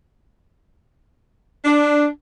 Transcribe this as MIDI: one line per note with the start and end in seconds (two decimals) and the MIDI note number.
1.65 2.07 62